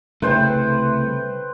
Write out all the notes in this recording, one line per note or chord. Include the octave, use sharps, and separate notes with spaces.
C2 C#3 A3 C#4 E4 B4 C5 G5